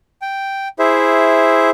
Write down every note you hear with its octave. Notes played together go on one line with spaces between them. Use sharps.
G5
E4 G#4 C5 E5